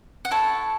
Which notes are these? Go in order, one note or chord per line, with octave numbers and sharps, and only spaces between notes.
F#5
E4 A4 C#5 A5